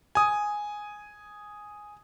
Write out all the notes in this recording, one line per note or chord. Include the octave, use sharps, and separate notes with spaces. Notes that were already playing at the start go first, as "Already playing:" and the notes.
G#5 D#6